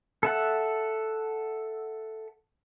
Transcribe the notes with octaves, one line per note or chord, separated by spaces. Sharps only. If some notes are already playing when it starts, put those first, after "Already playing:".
A4 E5 F#5